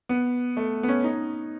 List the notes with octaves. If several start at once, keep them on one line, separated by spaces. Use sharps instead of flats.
B3
A3
B3
C#4
D#4